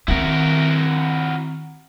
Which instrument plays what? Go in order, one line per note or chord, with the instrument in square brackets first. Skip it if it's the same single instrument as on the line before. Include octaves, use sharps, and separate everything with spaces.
[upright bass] D#3 C4 [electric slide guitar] E4 F#4 A#4